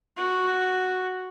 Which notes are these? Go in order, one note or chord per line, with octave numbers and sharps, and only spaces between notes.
F#4